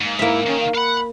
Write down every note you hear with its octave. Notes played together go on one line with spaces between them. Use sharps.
G#2 A#3
A#3 E4 E5
D#3 C#4
F5
F5 F#5 B5